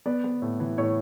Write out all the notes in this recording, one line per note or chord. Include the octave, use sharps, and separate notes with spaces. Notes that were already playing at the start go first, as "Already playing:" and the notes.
B3 D5
B3
A2
E3
A2 C#5